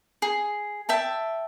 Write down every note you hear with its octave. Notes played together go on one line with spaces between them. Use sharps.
G#4
E5 G5 A5